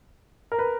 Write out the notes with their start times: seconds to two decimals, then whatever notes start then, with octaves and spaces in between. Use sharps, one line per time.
0.52 A#4
0.59 B4